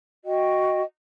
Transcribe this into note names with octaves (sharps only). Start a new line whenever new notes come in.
F#4 D#5 G5